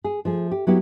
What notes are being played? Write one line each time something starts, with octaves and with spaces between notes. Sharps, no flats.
G#4
F3 A3 G#4
G4
F#3 B3 E4 G4